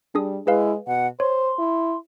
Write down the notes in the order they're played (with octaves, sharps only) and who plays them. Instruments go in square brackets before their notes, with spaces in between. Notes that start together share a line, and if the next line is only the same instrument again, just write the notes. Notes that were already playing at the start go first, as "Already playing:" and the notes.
[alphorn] G3 [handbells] D4 G#4 D#6
[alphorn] G#3 [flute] E4 [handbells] G#4 B4 F5
[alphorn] B2 [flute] F#5
[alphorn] C5 [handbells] C#5 [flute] C6
[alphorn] E4